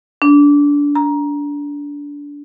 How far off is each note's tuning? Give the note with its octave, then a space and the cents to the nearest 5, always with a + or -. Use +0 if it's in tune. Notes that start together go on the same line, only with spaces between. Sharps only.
D4 -20
A#5 +15